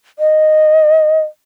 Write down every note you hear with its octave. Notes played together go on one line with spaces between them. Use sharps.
D#5